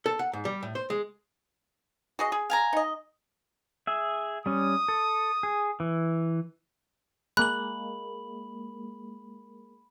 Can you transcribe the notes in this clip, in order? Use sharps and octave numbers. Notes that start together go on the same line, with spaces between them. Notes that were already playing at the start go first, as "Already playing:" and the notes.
A4
F#5
G#2
G3
A2
C5
G#3
F#4 G#4 D#5
G#4
F5 G#5 A#5
D#4 D#5
G#4 E5
G3 C#4 D#6
A4
G#4
E3
G#3 A#3 B5 F#6 F#7